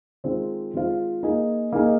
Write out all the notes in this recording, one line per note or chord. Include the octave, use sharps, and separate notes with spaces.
D#3 G#3 C4 F4 C5
D#3 G#3 C4 F4 C5
A#3 D#4 G#4 D#5
A#3 D#4 G#4 D#5